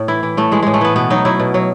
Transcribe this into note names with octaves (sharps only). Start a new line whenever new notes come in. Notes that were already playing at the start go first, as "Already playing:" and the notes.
Already playing: A2
E3 E4
E3
A2 A3
E3 G#3
A2 G#3
A3
E3 B3
B2 B3
F#3 D#4
F#3 E4
B2
F#3